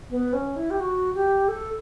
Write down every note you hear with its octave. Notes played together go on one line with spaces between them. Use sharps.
B3
C#4
E4
G4
F#4
G4
A4